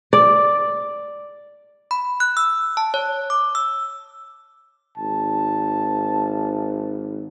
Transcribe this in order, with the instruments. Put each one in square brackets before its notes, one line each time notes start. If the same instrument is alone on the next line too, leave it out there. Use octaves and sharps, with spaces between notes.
[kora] D5
[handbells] B5
F#6
E6
A5
C#5
D6
E6
[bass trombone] G#1 [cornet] A5